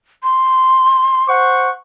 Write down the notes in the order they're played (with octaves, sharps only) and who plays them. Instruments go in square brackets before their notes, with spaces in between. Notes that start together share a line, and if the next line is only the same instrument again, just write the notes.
[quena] C6
[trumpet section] C5 F#5 C#6